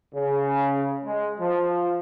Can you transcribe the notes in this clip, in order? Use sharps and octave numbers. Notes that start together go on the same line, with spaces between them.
C#3
G#3
F3